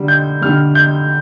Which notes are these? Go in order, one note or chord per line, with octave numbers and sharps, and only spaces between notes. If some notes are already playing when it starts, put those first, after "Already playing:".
Already playing: D3 G3
G6
D3 G3 F6
G6